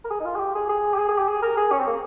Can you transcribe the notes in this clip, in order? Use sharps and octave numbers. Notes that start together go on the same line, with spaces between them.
A#4
G#4
D#4
F4
G#4
G4
G#4
G#4
G4
G#4
G#4
G4
G#4
A#4
G#4
C#4
C4
A#3